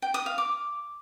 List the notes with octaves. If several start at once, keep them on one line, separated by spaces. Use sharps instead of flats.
G5
D#6
F5
D6